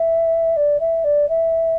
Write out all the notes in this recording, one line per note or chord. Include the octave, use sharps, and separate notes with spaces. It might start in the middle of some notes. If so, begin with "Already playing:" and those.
Already playing: E5
D5
E5
D5
E5